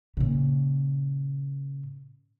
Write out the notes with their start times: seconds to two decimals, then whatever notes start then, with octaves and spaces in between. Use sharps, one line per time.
0.17 A#2 C#3